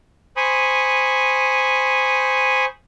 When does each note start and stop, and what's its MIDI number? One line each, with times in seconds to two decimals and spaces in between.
0.37 2.65 72
0.37 2.65 80
0.37 2.65 83
0.37 2.65 85
0.37 2.65 87